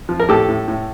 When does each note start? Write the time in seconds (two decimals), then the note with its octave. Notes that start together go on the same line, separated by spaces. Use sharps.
0.09 F3
0.20 A#4
0.29 A2 G4 A4
0.49 A2
0.68 A2